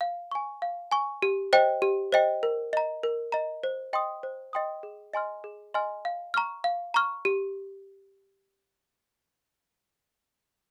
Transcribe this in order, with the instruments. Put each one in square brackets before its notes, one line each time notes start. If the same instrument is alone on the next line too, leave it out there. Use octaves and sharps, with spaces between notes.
[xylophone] F5
G#5 C#6
F5
G#5 C#6
G4
C5 D#5 G5
G4
C5 D#5 G5
A#4
D#5 A#5
A#4
D#5 A#5
C5
D#5 G5 C6 D#6
C5
D#5 G5 C6 D#6
G#4
D#5 G#5 C6 F6
G#4
D#5 G#5 C6 F6
F5
A#5 C#6 F6
F5
A#5 C#6 F6
G4